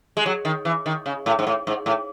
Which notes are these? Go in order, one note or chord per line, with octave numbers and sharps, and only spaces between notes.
G#3
F#3
D#3
E3
D#3
C#3
A2
G#2
A2
G#2
A2